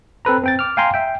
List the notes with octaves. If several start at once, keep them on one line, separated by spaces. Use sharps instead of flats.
C4 A4 B4 A#5
C4 G5 A6
D6 F6
F5 G5 G#5 A#5 C6
E5 G5